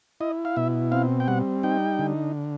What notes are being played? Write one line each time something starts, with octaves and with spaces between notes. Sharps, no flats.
E4 D#5
F5
B2 E5
C4 F5
G5
G3 F#5
D#4 G5
D3